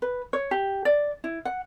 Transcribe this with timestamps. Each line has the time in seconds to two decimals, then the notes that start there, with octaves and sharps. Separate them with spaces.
0.02 B4
0.33 C#5
0.51 G4
0.85 D5
1.24 E4
1.45 F#5